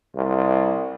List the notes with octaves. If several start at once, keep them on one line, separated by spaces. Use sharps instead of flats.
C2